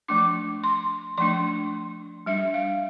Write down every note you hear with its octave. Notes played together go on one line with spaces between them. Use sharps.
F3 A3 D4 D6
C6
F3 A3 D4 C6
G3 D4 E5
F5